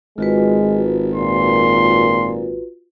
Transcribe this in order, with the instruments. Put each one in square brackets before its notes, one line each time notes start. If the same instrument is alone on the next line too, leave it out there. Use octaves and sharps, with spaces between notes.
[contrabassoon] G#1 [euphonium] G#3 [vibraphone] F4 F#4 B4
[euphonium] A#2 [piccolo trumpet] C6